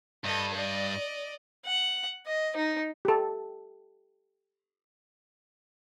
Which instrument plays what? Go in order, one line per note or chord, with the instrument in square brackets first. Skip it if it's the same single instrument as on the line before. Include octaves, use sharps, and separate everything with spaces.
[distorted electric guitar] G2 [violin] A4 D#5
[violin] D5 D#5
[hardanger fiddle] F#5
D#5
D#4
[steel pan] G4 A4